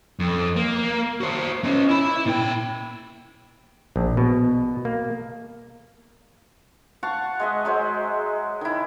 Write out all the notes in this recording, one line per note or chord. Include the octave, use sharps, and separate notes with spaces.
F2
A#3
F#4 C5
C#4 D#5
E4 B5
A#2 G5
A#1
B2
A#3
F5 F#5 A5 C#6
G#3 D#5 E5
F#3 G#3 C5
D#3 E4